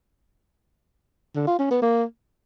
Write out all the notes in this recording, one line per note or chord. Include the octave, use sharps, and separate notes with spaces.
D3
F4
C#4
B3
A#3